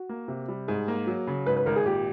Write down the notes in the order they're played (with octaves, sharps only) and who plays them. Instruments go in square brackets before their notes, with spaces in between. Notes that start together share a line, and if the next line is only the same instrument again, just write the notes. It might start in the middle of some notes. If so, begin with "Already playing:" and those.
Already playing: [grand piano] F#4
[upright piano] A#3
C3
G3
[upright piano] G#2 [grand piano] G#4
[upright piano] A#3
F#3
C#3
[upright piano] G#2 [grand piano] B4
[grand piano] B4
[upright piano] G#1 [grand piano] A#4
[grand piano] G#4
[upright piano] A#2 [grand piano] G4